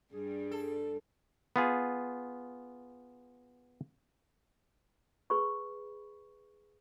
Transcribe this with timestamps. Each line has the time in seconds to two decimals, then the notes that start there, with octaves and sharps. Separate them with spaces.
0.13 G2 G3 G#4
0.51 A4
1.56 B3 F4 G#4
5.30 G#4 B4 B5 C#6